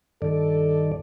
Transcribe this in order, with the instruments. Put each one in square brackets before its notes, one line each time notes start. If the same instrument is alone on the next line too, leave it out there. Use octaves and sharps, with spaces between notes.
[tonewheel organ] G2 D#3 D5 [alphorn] A4